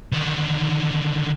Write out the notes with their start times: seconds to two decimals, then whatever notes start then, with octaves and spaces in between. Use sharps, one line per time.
0.12 D3 D#3